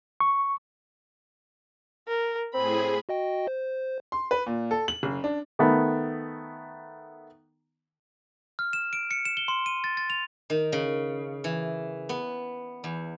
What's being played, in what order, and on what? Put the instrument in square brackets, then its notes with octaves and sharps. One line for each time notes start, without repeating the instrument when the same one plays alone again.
[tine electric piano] C#6
[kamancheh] A#4
[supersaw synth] A2 G#4 [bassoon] C4 [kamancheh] B5
[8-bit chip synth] F#4 D#5 G5
C5
[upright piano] C6
B4
A#2
A4
F#7
F#1
D4
[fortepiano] D#3 A3 B3
[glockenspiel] F6
E7
D7
C#7
E7
G7
C6
D#7
A6
A6
F7
[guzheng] D#3
C#3
E3
B3
E2